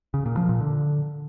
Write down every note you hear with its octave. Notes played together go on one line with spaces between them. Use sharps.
C#3
A#2
F3
A#2
D3